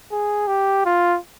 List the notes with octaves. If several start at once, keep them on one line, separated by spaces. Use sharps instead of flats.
G#4
G4
F4